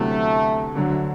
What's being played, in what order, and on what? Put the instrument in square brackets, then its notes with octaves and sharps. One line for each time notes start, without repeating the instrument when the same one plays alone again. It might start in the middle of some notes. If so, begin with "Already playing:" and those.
Already playing: [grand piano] D2 C3 F#3 B3 E4 [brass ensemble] A3
[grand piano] D2 D3 F#3